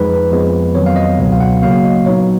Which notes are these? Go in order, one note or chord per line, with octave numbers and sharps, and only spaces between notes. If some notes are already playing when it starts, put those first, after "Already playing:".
Already playing: F2 F3 G#3 D#4 B4
F2 F3 G#3 B3
F2 D#3 F#3 B3 C#5
F5
D#5
C#2 B2 F#3 B3
F5
F#5
C#3 F#3 A#3 F5
D#5
A#2 F#3 B3 D#4 C#5